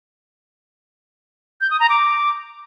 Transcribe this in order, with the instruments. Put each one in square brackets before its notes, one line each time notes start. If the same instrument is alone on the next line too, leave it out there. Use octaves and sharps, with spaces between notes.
[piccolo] G6
D#6
A#5
D6